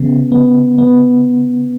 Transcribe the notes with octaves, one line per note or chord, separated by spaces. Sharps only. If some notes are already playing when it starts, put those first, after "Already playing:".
Already playing: C#3 B3
B3
B3